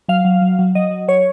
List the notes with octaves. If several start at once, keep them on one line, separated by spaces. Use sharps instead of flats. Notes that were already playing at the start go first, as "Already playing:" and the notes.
F#3 F5
F#3
F#3
F#3
F#3 D#5
F#3
F#3 C#5